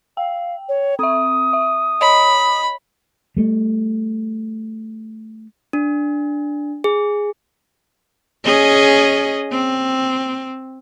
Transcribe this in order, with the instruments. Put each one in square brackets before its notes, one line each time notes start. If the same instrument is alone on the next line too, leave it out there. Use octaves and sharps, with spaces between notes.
[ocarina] F5 [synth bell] G5
[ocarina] C#5
[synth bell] C4 E5 [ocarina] D#6
[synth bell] E5
[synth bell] C#5 D#5 [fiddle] B5
[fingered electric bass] G3 A3
[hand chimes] D4
G#4
[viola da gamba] C#4 G#4 D#5
C4